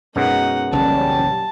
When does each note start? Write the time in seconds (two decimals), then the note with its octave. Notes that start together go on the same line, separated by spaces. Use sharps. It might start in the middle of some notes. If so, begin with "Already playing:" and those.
0.16 F#2 B2 G#3 D#4 F#5
0.72 F#1 B1 E3 G3 C#4 A5